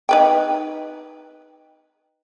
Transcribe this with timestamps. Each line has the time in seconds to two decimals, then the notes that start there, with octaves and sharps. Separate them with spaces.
0.09 D#4 B4 G5